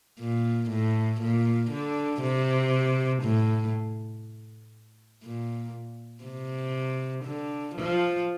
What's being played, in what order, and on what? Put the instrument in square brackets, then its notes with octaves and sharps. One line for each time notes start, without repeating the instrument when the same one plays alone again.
[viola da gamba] A#2
A2
A#2
D3
C3
A2
A#2
C3
D3
F3